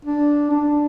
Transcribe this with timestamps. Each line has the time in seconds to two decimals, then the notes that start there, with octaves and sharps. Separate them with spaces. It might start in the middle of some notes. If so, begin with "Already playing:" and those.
0.05 D4
0.51 D4